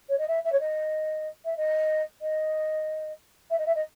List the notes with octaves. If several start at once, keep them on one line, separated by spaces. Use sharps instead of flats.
C#5
D#5
E5
E5
C#5
D#5
E5
D#5
D#5
E5
D#5
E5
D#5